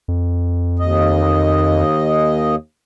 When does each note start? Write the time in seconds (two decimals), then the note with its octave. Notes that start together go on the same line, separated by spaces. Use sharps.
0.08 F2
0.79 D#2 D#5